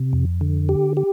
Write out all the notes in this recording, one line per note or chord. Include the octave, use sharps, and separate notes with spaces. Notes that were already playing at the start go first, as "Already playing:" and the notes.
Already playing: C3
F2
D3
G4
G4